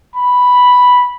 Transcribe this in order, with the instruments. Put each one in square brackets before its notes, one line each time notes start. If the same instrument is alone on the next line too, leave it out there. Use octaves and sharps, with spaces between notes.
[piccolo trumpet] B5